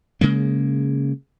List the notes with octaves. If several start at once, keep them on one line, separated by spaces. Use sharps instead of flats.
C#3 G#3 A#3